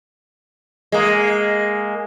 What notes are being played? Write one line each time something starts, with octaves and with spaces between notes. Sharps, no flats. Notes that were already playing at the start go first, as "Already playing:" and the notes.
G#3 A#3